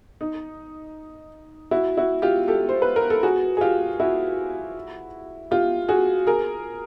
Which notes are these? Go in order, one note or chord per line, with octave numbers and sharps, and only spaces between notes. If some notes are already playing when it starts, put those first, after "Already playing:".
D#4
E4 F#4
E4 F#4
F4 G4
G4 A4
C5
B4
A#4
A4
F#4 G#4
G#4
F4 G4
E4 F#4
F4 G4
F#4 G#4
G#4 A#4